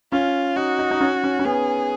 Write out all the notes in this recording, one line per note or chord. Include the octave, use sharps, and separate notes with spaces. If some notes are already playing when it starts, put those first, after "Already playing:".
C#4 F4
D#4 F#4
D#4
D#4
C#4
C#4
C#4
B3 G#4